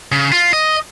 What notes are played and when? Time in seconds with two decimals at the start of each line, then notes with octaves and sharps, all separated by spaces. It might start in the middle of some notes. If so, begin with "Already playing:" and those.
0.12 C#3
0.32 F4
0.53 D#5